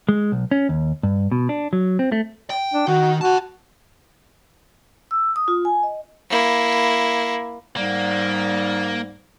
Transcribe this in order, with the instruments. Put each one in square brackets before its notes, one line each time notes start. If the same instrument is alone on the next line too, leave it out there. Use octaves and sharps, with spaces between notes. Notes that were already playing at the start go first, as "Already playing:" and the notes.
[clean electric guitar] G#3
B1
C#4
D#2
G2
B2
D4
F#3
C4
A3
[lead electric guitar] G5
[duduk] D4
[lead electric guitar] D#3 [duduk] F#4
[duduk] F#4 [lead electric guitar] F#5 A5
[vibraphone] E6
D#6
F4
G#5
D#5
[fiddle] A#3 E4
[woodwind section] G#2 G3 [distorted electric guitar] A#3